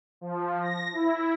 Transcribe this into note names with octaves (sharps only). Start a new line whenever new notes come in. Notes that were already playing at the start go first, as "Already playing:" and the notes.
F3
A#6
E4